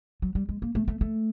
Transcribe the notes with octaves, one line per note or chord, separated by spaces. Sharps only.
F#3
G3
G#3
A#3
A3
A3
A3